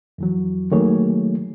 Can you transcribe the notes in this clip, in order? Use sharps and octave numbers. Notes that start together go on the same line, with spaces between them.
F2 E3 F#3
D#3 F#3 A3 A#3 G#4 C#5